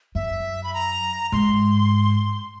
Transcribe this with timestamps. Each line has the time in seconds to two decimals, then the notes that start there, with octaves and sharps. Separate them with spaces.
0.15 F#2 E5
0.64 B5
0.74 A#5
1.32 G#2 C6